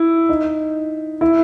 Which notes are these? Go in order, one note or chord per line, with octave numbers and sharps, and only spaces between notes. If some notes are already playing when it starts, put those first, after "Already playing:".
Already playing: E4
D#4
E4